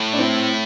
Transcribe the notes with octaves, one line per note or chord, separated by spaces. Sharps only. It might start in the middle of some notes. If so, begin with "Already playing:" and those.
Already playing: A2
D4
C4 E4